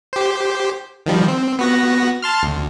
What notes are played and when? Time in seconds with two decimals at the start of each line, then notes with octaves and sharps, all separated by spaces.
0.13 G4 C5
1.06 D#3 F3 G3
1.28 C4
1.59 B3 F#4 A#6
2.22 A5 C6 F6
2.43 D2